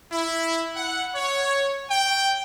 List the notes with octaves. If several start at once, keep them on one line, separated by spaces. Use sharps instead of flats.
E4
F#5
C#5
G5